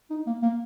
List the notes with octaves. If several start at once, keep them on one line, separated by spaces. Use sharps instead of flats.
D#4
A#3
A#3